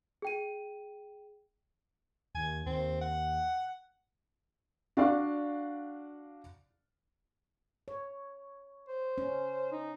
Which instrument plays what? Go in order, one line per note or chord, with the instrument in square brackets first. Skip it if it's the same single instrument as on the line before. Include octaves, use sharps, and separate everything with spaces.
[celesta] G#4 G5 D#7
[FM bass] D#2 [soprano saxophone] G#5
[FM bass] D#2 [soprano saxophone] C4
[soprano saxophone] F#5
[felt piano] D4 F#4 D5 F5
[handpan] C#5
[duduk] C5
[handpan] C#4
[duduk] D#4